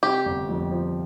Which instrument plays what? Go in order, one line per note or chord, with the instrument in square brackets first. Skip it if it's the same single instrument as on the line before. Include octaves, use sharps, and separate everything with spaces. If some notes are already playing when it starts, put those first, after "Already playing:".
[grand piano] C3 [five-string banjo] G4
[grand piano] G1
F2
F3